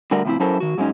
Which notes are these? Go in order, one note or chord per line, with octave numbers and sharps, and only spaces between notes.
D3 G3 A3 F#4 A#4 D5
A2 C#3 F3 B3 C4 E4
F#3 C#4 E4 A4 A#4 C5
D#3 F#4
G#2 F#3 G#3 B3 C#4 D#4